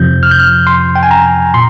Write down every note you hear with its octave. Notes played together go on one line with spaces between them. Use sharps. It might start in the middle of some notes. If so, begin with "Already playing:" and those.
Already playing: F2 C3 F3 G6
F6
G6
F6
C6
G5
G#5
A#5
A#2 C6